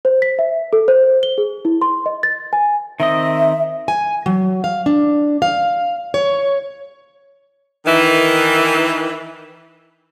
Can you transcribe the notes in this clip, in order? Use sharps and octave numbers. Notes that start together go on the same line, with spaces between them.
C5
B6
E5
A4
C5
G7
G#4
E4
C6
D#5
A6
G#5
D#3 C4 D#5 E5
G#5
F#3
F5
D4
F5
C#5
D#3 E3